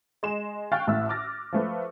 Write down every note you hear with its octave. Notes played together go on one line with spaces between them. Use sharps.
G#3 D#5 C6 E7
F5 G5 C#6 F6 F#6 A6
A1 A2 A3 E5 E6
D6 F6 A6 A#6
F3 A3 B4